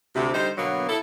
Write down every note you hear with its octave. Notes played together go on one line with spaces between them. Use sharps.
D2 C3
D3 G3 D#4 C5
B2 D3 F#3 A#3 B3
E4 A4